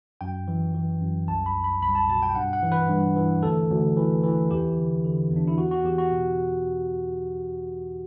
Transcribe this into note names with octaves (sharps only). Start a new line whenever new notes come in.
F#2 G5
E3
E3
F#2
C2 A5
B5
C2
B5
C2 B5
A5
B2 A5
G5
G2 F#5
F#5
E3
B4
G2
E3
D2 A4
D2
E3
E3
E2 G4
D3
D3
E2
D4
E4
E2 F#4
F#4
E2 G4
F#4
B2